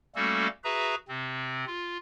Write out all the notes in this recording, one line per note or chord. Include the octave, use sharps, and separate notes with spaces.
G3 A3 A#3 C#4 F#4 A4
F#4 G#4 B4 E5 A#5
C3 C4
F4